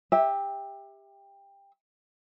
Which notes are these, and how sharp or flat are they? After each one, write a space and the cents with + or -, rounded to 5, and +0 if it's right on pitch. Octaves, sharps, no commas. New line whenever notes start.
G4 +20 E5 -15